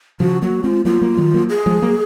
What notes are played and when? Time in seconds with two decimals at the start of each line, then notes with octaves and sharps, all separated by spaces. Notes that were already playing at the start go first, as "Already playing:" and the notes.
0.20 C#3 F3 F#4
0.42 F#3 A#3 F#4
0.64 G#3 C4 F4
0.85 F#3 A#3 F4
1.01 F#3 A#3
1.17 D#3 F#3
1.34 F#3 A#3
1.49 G#4
1.66 F3 G#3
1.82 F#3 A#3